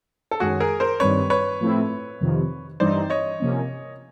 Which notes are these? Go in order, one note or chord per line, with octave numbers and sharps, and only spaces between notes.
A4
F#2 D#3 G#3 C#4 F#4 G#4
G#4 A#4
A#4 C5
G2 D#3 G3 C4 B4 C#5
B4 C#5
A2 F3 A3 C4 E4
F2 C3 D#3
G2 E3 G3 C4 D#4 C5 D5
C#5 D#5
C3 F3 A#3 C#4